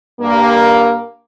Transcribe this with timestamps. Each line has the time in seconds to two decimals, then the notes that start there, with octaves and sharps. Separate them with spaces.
0.20 G2 A#3